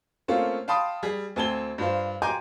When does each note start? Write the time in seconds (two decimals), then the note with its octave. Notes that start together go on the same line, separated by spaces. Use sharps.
0.28 A3 A#3 C4 C#4 F4
0.68 F5 G5 A5 B5 C6 D#6
1.03 G3 G#4
1.36 D2 C4 A5 G#6 G7
1.78 G2 F4 C5
2.22 G5 G#5 A#5 C6 D6 G6